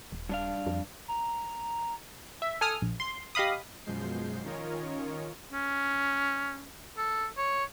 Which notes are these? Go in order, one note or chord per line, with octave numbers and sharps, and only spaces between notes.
D#1
G2 D4 F5
F2
A#5
E5
A4 G#5 D#6 F6
A#1
C6
G4 D#5 F5 B5 D#6
F#2 B2 F3 G#3 G6 C7
D#3 C#4 F4 A#4 C#5 D#5
C#4
A4
C#5